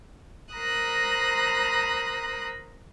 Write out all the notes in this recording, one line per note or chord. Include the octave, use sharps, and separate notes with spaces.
A#4 C5 A#5 B5 D#6 F#6